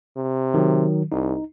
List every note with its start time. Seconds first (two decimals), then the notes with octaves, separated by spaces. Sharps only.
0.17 C3
0.54 D#3 F#3
1.12 C2 D#4